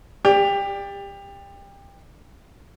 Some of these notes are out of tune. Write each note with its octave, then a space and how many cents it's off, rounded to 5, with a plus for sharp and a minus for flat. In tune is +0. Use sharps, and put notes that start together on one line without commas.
G4 +25 D5 +0